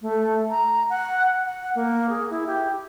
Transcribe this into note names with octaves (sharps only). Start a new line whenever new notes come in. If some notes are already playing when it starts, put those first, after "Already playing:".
A3
A#5
F#5
F#5
A#3
G#4
E4
G4